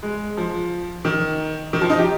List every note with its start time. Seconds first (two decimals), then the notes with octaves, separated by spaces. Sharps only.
0.03 G#3
0.37 F3
1.05 D#3
1.73 D#3
1.81 F3
1.90 D#4
1.98 G4